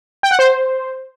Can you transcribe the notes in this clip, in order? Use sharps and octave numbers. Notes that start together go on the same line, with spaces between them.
G5
F#5
C5